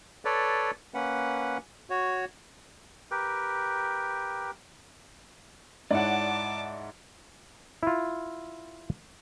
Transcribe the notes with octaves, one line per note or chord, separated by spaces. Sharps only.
A4 B4 C#5 D5
A#3 C#4 B4 F#5
F#4 C#5
G4 A#4 B4 G5
G#2 E4 C#5 D5 F#5 A5 D6
E4 F4